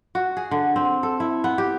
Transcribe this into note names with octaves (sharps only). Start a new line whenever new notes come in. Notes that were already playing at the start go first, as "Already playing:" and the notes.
F#4
G#4
D3
C4
A4
E4
B3
G4